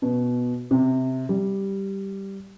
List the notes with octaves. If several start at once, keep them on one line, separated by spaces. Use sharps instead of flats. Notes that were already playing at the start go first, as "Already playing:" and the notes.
B2
C3
G3